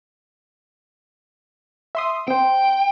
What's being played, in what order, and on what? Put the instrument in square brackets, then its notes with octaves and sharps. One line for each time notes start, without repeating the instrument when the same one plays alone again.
[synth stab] E5 C6 D#6
[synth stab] C4 C5 [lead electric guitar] G5